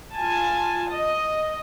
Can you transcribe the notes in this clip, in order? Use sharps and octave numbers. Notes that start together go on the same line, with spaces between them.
F4 G#5 A5
D#5